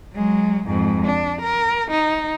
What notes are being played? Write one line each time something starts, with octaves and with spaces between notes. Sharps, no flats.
F#3 G#3
F2 G#2
D4
A#4
D#4